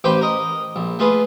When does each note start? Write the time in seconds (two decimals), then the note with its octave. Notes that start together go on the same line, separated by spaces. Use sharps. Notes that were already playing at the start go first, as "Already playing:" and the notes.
0.04 A1 G4 B4 C5 G5 B5
0.21 A#4 D#5
0.76 A#1
0.99 A3 F4 G#4 B4